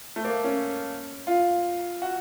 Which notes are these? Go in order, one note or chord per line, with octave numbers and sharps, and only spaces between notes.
A3
A#3
C#4
F4
F#4